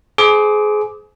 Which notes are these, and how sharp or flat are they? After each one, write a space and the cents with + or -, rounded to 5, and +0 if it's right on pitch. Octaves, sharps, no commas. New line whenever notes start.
G#4 +25 C5 -25 D6 +0